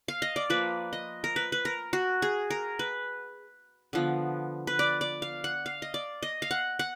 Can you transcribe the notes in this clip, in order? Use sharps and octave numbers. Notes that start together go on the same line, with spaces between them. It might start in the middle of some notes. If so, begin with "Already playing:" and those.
F5
D#5
D5
F3 A#3 B4
D#5
A#4
B4
B4
A#4
F#4
G#4
A#4
B4
D3 F3 B3
B4
D5
D5
F5
F#5
F5
D#5
D5
D#5
F5
F#5
F#5